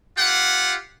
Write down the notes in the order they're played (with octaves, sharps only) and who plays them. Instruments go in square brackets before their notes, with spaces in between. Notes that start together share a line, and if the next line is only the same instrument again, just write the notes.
[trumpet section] F4 G4 F#5